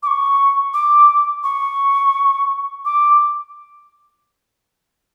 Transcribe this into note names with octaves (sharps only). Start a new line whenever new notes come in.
D6
C#6
D6
C#6
D6